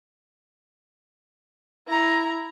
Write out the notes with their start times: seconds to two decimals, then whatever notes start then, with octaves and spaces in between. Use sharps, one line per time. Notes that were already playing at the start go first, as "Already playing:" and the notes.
1.88 E4 A#5